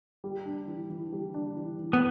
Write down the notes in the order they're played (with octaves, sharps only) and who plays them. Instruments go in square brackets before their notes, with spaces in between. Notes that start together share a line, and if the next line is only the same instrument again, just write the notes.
[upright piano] G3
D4
E3
E3
G3
D4
E3
E3
[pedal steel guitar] B3